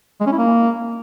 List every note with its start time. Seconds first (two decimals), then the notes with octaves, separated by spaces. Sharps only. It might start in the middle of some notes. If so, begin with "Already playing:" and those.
0.21 G#3
0.26 C#4
0.32 E4
0.38 A#3